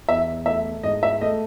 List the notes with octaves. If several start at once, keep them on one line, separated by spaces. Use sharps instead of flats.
E2 E5
A3 E5
G#2 D#5
E5
A3 D#5